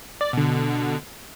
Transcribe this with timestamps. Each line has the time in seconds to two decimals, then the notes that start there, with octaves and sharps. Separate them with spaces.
0.21 D5
0.33 B2 D3